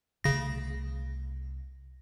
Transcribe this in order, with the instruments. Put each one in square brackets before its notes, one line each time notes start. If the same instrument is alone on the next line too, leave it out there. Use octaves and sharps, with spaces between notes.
[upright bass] C2 A3 [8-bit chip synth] C#3 A#6